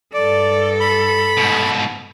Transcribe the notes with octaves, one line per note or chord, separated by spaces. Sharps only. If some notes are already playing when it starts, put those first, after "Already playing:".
G2 A4 D5
B5
G#2 B2